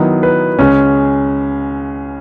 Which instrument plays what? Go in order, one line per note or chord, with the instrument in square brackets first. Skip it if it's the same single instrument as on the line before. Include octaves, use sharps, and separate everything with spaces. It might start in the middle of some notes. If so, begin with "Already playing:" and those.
Already playing: [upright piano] D#3 F#3 B3 D#4 [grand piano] E4
[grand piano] B4
[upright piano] C#2 C#3 G#3 [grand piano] C#4